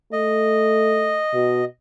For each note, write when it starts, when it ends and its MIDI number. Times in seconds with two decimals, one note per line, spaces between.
0.12 1.22 57
0.12 1.65 75
1.34 1.63 47